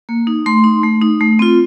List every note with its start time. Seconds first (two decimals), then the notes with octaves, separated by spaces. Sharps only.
0.09 A#3
0.27 D#4
0.46 A3 C6
0.64 D#4
0.83 A3
1.02 D#4
1.21 A3
1.39 C4 F4